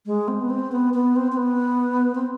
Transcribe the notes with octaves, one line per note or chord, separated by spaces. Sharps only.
G#3
C4
B3
C4
B3
B3
C4
C4
B3
C4